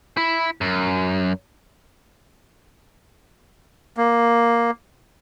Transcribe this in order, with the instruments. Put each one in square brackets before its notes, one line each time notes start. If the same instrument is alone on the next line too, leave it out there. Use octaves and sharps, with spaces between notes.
[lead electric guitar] E4
F#2
[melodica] A#3